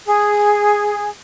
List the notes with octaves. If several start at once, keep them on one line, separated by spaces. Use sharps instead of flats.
G#4